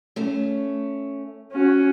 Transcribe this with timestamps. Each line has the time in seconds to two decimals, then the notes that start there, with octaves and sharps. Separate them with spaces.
0.16 A3 C#4
1.52 C#4 F#4